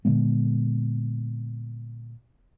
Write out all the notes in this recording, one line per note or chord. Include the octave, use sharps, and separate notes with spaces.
A#2 D3 G#3 B3